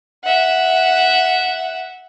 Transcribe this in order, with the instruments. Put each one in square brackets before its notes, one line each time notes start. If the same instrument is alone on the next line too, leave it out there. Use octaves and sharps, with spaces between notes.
[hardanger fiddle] E5 F#5